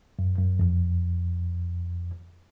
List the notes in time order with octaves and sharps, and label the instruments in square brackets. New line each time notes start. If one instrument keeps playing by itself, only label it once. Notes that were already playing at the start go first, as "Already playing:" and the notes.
[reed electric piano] F#2
F#2
F2